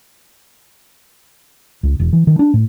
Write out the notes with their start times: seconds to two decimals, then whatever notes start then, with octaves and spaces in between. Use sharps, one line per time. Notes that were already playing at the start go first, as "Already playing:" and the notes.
1.83 C#2
2.00 E1
2.13 E3
2.27 D#3
2.39 D4
2.54 A2